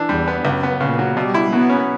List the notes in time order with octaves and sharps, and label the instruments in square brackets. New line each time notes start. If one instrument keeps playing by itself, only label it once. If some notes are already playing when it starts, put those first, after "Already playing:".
Already playing: [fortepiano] E3 D4
[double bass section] E2 [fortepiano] G3
[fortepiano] B3
[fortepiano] C#2 [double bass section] F#2
[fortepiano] B3
[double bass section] A#2 [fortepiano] C#3
[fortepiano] F#3
[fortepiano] B2 [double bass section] G3
[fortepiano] E4
[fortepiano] F#3 [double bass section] B3
[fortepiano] C#4